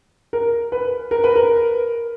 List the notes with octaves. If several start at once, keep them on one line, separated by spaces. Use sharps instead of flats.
A#4
B4
A#4
B4
A#4